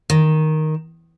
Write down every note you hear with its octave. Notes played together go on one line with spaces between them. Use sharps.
D#3